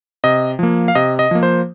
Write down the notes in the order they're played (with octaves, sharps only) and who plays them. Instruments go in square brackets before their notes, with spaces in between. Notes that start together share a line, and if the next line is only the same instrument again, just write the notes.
[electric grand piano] C3 D#5
F3 A#3
F5
C3 D#5
D#5
F3 A#3
C5